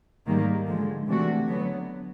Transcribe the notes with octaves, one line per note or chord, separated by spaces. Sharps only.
G#2 D#3 G3 A#3
D3 F3 G#3
C3 E3 A3 D4 F#4
D3 F#3 B3